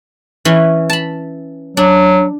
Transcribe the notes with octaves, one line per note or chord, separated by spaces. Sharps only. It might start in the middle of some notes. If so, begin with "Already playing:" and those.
E3 C#4 E4
A5 B5
F#3 D4